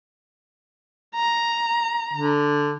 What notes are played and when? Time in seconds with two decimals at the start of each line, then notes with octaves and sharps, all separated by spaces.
1.15 A#5
2.13 D3